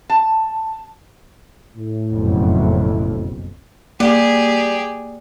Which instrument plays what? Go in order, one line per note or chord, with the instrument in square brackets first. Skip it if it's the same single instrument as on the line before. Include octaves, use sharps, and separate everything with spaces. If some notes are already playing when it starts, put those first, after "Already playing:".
[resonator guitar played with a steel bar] A5
[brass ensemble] A2
[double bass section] F#1 B1 F2
[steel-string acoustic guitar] G3 [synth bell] A#3 [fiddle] G4 G#4